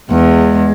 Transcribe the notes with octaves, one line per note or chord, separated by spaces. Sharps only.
E2 G#3